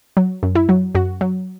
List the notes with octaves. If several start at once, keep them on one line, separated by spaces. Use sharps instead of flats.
F#3
F#2
E4
F#3
F#2 F#4
F#3